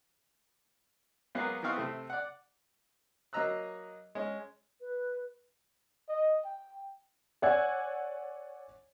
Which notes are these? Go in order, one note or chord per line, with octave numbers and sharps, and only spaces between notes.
F#3 G#3 A#3 B3 G#4 F#5
E3 B3 C4 F5 C#6 D#6
C3 A3 C4
D5 F#5
F#3 A#3 D#5 A#5 E6 F#6
G#3 C#4
B4
D#5
G5
C#5 D5 F#5 G#5 E6 G#6